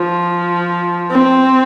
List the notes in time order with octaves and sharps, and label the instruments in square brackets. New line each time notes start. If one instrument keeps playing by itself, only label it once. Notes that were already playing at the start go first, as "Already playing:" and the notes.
Already playing: [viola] F3
C4